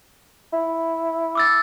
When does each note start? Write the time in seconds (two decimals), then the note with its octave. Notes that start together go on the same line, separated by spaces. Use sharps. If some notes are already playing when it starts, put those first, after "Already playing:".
0.53 E4
1.35 D6 E6 A6